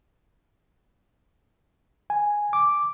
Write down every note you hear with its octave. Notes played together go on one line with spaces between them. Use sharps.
G#5
D6